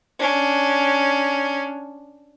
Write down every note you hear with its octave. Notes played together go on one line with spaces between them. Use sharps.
C#4 D4